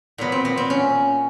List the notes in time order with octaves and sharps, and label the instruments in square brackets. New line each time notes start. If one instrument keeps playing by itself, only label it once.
[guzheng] A#2 F#3 B3
C4
B3
C4
C#4